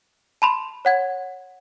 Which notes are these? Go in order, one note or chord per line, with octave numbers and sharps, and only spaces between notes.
A5 B5 C6
C#5 F#5 G#6